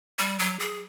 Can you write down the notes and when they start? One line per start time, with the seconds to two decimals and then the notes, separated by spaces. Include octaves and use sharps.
0.19 G3
0.39 F#3
0.59 G#4